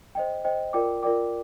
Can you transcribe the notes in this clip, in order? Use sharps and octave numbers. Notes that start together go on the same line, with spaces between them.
C5 D#5 G5
C5 D#5 G5
F4 A#4 D5 G5 D6
F4 A#4 D5 G5 D6